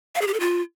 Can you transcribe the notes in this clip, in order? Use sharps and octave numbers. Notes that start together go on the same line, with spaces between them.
F5
G#4
G4
A4
F4